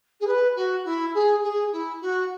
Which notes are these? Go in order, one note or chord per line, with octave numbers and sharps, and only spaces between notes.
G#4
B4
F#4
E4
G#4
G#4
E4
F#4